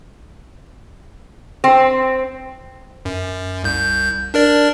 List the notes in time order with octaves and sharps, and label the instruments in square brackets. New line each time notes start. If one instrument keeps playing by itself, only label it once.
[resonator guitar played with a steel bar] C4
[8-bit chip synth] F#2
C2 G6
D4 A#4 D5